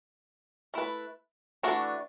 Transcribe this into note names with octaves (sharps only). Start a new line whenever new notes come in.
A3 E4 B4
E3 A3 D4 F#4